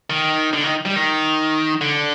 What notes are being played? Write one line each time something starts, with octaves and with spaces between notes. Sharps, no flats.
D#3
D3
D#3
G3
D#3
D3